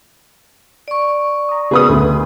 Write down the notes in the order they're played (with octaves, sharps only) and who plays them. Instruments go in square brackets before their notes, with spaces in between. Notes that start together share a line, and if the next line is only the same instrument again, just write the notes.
[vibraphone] D5 C#6
[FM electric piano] A#5 D#6
[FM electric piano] C#3 B3 A#4 [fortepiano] G#4 B4 D#6
[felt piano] D2